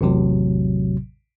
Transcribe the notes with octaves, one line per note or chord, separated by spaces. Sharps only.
A1 E2 A2 C3 F#3